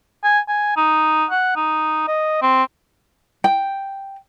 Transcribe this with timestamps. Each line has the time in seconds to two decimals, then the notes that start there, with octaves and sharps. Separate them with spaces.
0.24 G#5
0.48 G#5
0.77 D#4
1.30 F#5
1.56 D#4
2.08 D#5
2.42 C4
3.44 G5